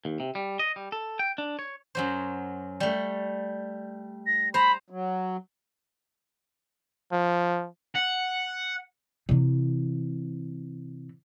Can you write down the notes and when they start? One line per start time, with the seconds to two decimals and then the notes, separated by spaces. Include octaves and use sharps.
0.05 D#2
0.20 C3
0.35 G3
0.59 D#5
0.76 G3
0.92 A4
1.19 G5
1.38 D4
1.59 C#5
1.95 F#2 F#3 C5
2.80 G3 A3
4.27 A#6
4.54 C5 A#5 B5
4.90 F#3
7.12 F3
7.95 F#5
9.29 C3 E3